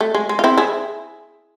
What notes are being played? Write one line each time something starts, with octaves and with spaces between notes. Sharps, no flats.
A3
G#3
G#3
F4
C4 E4
E4 G#4